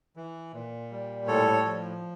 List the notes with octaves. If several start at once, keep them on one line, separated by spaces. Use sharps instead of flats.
E3
A#2
G3
A2 A4 C#5
F3